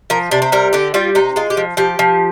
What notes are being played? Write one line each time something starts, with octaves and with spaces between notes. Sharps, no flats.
F3 A#4
C3 D4
C4
G3 A#4
D3 G4
G3 F4
C3 D#4
G#3 F4
G4
F3
F3 G4
F3